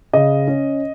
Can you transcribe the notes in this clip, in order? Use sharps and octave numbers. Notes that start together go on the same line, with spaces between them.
C#3 D#5
C#4